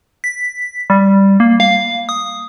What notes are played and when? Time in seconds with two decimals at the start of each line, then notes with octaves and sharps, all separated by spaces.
0.24 B6
0.90 G3
1.40 A#3
1.60 F5
2.09 D#6